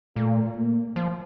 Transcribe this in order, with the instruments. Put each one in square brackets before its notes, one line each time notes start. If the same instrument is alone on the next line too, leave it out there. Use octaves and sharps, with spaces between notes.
[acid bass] A#2 [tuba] A3
[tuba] A#3
[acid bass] F3